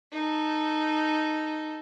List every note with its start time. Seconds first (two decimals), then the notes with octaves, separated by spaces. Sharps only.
0.13 D#4 A4